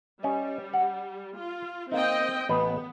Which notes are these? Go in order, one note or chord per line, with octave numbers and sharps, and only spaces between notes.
G3 C#4 D#5
F#5
F4
A#3 C4 D#4 D#5 G5
A1 B3 B4 D#5